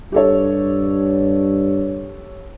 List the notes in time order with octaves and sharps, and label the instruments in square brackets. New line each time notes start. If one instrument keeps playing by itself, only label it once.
[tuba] G2 [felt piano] G4 A4 C#5